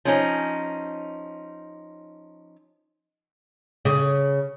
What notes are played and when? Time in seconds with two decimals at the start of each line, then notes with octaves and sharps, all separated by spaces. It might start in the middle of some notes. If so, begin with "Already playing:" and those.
0.05 F3 C#4 D#4
3.85 C#3